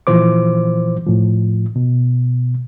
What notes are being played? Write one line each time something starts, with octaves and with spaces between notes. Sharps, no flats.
A#2 E3 F3 C5 D6
A2 F3
B2